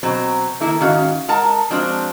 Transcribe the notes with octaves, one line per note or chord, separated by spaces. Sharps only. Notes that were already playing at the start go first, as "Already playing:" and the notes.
B2 F#3 C4
D#3 A3 A#3 E4
G#2 D#3 C#4 F#4 F5
G#3 A#4 F#5 A5 A#5
F3 G#3 C4 D4 F4 F#4